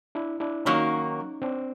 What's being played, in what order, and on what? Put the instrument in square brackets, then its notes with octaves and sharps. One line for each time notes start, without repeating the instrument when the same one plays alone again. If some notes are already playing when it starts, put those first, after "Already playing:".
[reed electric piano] D4 E4
D4 E4
[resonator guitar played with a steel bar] D#3 F#3 A#3 [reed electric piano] C#4 D#4
[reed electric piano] C4 D4